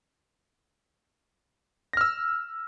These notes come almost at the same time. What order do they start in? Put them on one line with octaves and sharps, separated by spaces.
A#6 F6 E6